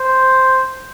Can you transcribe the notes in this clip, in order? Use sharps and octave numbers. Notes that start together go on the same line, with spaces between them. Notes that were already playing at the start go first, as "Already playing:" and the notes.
Already playing: C5